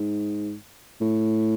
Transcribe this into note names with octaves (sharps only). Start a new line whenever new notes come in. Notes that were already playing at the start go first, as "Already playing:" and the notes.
Already playing: G#2
A2